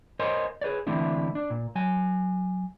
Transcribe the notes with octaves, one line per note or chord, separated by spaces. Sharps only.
A#4 C5 C#5 D#5 G#5 C6
G#4 B4 C#5 D5
D3 E3 A3 C4 D4 E4
D4
A#2
F#3 G#5